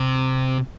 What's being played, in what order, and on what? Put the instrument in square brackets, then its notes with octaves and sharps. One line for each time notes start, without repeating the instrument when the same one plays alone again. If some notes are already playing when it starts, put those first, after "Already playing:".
Already playing: [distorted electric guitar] C3